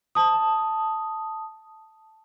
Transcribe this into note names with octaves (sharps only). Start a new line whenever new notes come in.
A5 D#6